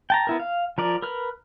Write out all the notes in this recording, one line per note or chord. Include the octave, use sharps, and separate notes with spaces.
G5 A5 A#5
B3 E4 A#4
F5
F3 A#4 D5
A#4 B4 F6